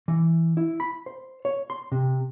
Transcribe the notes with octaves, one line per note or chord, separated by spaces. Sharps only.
E3
E4
B5
C5
C#5
C6
C3